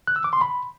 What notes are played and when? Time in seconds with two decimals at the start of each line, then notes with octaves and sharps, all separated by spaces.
0.07 F#6
0.16 E6
0.24 D6
0.33 C6
0.41 B5